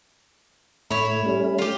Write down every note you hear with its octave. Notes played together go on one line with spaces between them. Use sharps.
A2 A3 E4 C#5
G3 A3 C#4
F4 G4